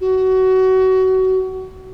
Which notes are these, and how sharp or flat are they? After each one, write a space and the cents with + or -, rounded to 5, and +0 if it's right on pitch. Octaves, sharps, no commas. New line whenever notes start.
F#4 +25